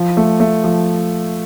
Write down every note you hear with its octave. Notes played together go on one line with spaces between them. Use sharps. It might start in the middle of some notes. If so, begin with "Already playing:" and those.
Already playing: F3
A3
A3
F3